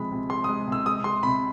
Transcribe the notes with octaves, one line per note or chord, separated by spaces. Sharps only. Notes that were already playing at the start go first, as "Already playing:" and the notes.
Already playing: C3 F3 G#3 B5
C3
G#3 C6
D#6
G#3
C3 E6
G#3 D#6
G#3 C6
C3 B5